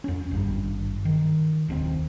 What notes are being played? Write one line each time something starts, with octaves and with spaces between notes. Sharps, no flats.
F2 C#4
G#1 G2
D#3
F1 D#2 C4